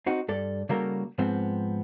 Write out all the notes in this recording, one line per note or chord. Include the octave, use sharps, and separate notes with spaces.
C4 D#4 F#4
G2 A4 D5
C#3 G3 A#3 F#4 A4 A#4
G#2 F3 B3 C4